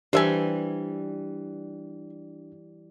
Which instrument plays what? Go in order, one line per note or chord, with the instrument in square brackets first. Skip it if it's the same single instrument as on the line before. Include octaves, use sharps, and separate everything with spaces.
[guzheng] E3 G3 [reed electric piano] D4 [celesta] G4 [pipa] C5 E5 G#5